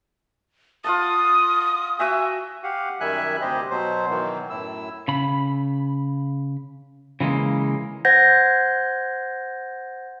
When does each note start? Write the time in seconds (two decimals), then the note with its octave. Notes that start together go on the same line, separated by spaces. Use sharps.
0.84 F4 F#5 A5 D#6
1.99 F#4 E5 G5 G#5
2.63 G4 F5 F#5
3.00 F#2 D#3 G3 E5 G#5 F#6
3.41 D2 C3 G3 G4 C5 D#5
3.71 B2 F#3 C5
4.09 B2 D#3 E3 F#3
4.50 F#2 A2 E4 E6
5.08 C#3 B5
7.20 C#3 E3 G#3 A#3
8.05 C5 F#5 G6 G#6 A#6